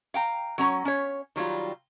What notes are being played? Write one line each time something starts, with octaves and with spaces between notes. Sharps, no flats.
F5 G5 A#5
F#3 C#4 A#5
C#4 C#5
D#3 F#3 G3 F4